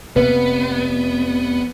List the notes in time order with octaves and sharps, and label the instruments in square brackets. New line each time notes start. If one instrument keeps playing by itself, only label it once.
[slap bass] F1 C3 A#3 [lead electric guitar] B3 [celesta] B4